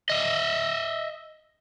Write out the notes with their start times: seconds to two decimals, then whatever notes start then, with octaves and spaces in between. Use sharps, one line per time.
0.10 D#5 E5